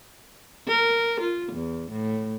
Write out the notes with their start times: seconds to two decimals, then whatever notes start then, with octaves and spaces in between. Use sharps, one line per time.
0.68 A#4
1.20 F4
1.52 E2
1.91 A2